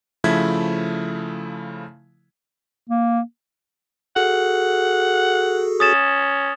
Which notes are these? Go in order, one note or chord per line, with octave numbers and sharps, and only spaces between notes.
C#3 F3 A3 E4 G#6 B6
A#3
F#4 G#4 A4 F#5
C#4 D#6 A6 E7